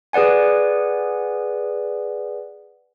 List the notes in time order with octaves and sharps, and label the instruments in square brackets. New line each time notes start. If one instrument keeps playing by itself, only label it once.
[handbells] G#4 B4 D5 F#5 G#5